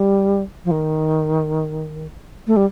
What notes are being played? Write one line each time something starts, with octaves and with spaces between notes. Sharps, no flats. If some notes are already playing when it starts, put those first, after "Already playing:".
Already playing: G3
F3
D#3
A3
G3